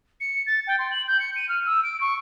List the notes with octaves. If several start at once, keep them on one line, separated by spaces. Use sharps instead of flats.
C#7
A6
G5
C6
F#7
G6
C#7
D#7
F6
E6
D7
C#6